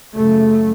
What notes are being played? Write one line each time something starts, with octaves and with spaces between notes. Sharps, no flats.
F#2 C#3 A3